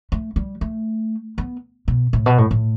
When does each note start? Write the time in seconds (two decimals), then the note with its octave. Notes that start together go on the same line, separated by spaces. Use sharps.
0.12 A3
0.36 G3
0.61 A3
1.38 B3
1.88 B2
2.13 A2
2.26 B2
2.38 A2
2.51 A2